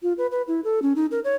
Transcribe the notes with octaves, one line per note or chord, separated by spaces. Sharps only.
F4
B4
B4
E4
A4
C#4
D#4
A#4
C#5